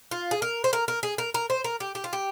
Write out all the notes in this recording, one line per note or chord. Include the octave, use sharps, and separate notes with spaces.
F4
G#4
A#4
C5
A#4
A#4
G#4
A#4
A#4
C5
A#4
G4
G4
F4
G4